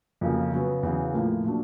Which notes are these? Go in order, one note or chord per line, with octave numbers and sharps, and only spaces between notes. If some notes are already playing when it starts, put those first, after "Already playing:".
F2 C#3 F#3 A#3
C#3 F#3 B3
E2 C#3 F#3
A2 F3 A#3
A#2 F#3 A#3 D4